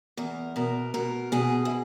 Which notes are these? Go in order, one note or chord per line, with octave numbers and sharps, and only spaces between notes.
E2 A#4
B2 A#4
B2 A#4
B2 G#4
E4